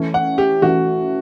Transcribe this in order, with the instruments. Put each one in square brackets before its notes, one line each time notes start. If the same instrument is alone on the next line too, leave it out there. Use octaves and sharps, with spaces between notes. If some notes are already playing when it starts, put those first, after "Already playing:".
Already playing: [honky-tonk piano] E3 A3 C#4
[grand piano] F#5
G4
[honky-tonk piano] E3 A3 C#4 [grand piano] F#4